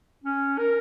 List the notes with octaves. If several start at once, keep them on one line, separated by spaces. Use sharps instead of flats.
C#4
A#4